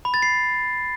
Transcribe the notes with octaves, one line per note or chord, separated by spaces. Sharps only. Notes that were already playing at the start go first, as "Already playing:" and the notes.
B5
A6
C7